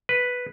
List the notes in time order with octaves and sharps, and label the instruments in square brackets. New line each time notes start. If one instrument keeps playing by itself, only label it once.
[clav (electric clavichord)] B4